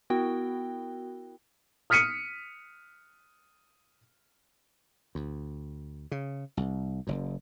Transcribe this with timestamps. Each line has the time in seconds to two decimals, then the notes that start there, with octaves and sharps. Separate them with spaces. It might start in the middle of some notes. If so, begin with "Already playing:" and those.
0.10 B3 E4 F#4 A#4 G5
1.90 D#6 F6 B6 C#7 D#7
5.15 D2
6.11 C#3
6.57 C2
7.07 F#1 F#2